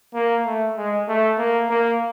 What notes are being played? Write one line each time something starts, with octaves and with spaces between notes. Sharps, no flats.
A#3
A3
G#3
A3
A#3
A#3